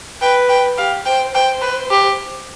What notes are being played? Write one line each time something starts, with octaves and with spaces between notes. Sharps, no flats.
B4 G5
G5
G4 F5
C5 G5
C5 G5
B4
G4